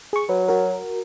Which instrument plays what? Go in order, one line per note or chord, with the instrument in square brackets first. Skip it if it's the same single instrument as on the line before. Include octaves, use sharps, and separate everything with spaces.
[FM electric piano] G#4 C#6
[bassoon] F#3 [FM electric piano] B4
[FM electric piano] F#4 A#4